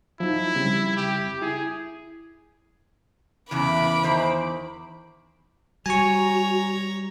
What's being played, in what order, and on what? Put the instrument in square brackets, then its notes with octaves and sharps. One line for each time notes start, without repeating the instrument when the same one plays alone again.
[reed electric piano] F3 F#3 D#4 [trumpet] E4
[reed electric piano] C#3 G3 C4
[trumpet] G4
[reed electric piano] E4 [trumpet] G#4
[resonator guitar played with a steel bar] E2 C#3 E3 [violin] B5 D6
[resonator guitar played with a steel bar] E2 D#3 C5
[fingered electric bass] G3 [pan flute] F#4 [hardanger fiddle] C#5 A#5 [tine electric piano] G#5 C#6